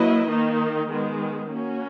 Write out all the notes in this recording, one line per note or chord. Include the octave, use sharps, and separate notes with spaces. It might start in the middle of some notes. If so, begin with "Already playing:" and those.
Already playing: F#3 A#3 E4 B4 D#5
D#3 A#3 D#4
D#3 G#3 B3
A#3 C#4 F#4